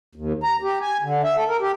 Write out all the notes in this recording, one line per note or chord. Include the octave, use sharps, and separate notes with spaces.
D#2
A#5
G4
G#5
D3
E5
A4
A#4
G4